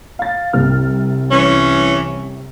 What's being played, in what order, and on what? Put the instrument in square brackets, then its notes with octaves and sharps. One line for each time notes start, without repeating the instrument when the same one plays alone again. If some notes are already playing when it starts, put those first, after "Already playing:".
[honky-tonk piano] F5 A6
C2 C3 F6
[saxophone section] E3 C#4